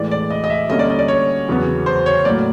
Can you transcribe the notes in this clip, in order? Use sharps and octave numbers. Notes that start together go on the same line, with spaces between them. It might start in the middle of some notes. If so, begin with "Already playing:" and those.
Already playing: A2 E3 G#3 D5
D5
D#5
D#5
E5
D3 G3 A#3 C#4 D#5
D5
D#5
D5
C#5
E2 C#3 F#3 B3
C5
C#5
A2 F#3 A#3 D5